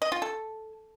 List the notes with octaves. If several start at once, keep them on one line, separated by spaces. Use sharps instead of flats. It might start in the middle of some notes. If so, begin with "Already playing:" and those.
D#5
F4
A4